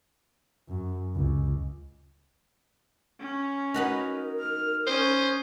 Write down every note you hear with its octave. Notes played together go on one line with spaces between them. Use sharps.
F#2
C#2
C#4
D#4 F#4 A#4 B4
F6
C#4 C5 D#6